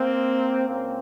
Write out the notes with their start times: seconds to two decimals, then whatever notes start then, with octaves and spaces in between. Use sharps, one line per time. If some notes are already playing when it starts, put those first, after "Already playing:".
Already playing: A#3 C4
0.68 C#2 C#3 A#3 C4